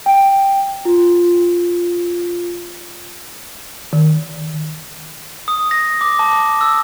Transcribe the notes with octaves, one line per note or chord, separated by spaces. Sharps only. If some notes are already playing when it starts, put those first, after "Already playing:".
G5
F4
D#3
D#6
A#6
D6
A5
E6